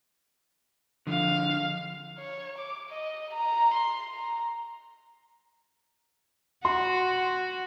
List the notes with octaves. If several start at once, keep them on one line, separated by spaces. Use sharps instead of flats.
D3 F3 F5
C#5
D6
D#5
A#5
C6
A#5
F#4 C6